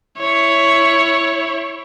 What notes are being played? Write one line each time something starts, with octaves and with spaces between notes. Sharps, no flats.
E4 C#5